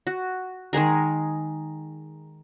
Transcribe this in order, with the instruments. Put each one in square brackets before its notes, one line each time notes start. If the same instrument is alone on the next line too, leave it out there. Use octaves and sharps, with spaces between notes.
[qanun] F#4
D#3 G#3 G#4 A#4